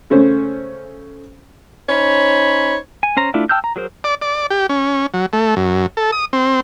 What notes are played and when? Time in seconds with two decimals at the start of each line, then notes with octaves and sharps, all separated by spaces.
0.10 C#3 A3 C#4 C5
1.89 C#4 D#4 C5 C#5 B5
3.03 G#5
3.17 C#4 C5 A#5
3.34 A3 D4 E4 F4
3.49 G5 A5 E6 F6 G6
3.64 A#5
3.76 F#3 G#4 A#4 C5
4.04 D5
4.22 D5
4.50 G4
4.69 C#4
5.14 F#3
5.33 A3
5.56 F#2
5.97 A4
6.12 D#6
6.33 C4